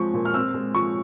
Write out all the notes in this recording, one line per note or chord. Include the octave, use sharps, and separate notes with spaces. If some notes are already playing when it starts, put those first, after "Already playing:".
Already playing: F3 G#3 C4 C#6
A#2
F6
C4 E6
G#3
F3 C#6